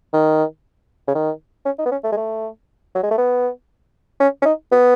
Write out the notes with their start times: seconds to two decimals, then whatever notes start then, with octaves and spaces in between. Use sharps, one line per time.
0.13 D#3
1.08 C#3
1.15 D#3
1.66 C#4
1.78 D#4
1.85 B3
1.92 C#4
2.04 A3
2.12 G#3
2.17 A3
2.95 F#3
3.03 G#3
3.11 A3
3.18 B3
4.20 C#4
4.41 C#4
4.45 D#4
4.72 B3